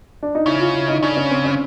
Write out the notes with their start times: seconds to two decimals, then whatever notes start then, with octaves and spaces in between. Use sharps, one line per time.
0.23 D4
0.35 D#4
0.46 C#3 E4
0.60 F4
0.74 E4
0.88 D#4
1.02 C#3 D4
1.17 C#4
1.30 C4
1.45 C#4